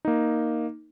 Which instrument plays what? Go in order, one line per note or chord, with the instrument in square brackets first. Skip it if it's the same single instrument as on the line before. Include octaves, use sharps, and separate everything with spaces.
[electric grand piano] A#3 D#4